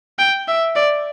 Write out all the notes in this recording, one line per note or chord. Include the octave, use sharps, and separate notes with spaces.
G5
E5
D5